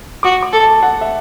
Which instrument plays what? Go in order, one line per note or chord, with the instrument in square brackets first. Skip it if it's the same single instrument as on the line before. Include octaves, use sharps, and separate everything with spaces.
[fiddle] F#4 [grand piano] D6
[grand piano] D6
[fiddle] A4
[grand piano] A5
F#5
E5